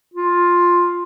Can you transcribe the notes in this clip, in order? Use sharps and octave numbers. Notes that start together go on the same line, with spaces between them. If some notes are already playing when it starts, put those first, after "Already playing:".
F4